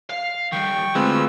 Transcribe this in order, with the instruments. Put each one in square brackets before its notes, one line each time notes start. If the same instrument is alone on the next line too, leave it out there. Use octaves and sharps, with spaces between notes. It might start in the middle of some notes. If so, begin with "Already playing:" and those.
[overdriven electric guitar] F5
[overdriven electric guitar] D#3 G3 [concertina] G5 C#6
[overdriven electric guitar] D2 [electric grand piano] G#3 C4 [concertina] F4 B4 E6